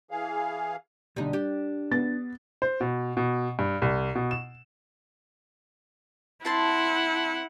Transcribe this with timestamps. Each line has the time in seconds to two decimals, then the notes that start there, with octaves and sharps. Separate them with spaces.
0.11 E3 G#4 F5
1.16 B1 A#2 D3 G3 D#4
1.33 D4 G4
1.91 B3 A6
2.62 C5
2.81 B2
3.17 B2
3.59 G2
3.82 C2
4.15 B2
4.31 E7
6.45 C4 E4 F#5 A5 C6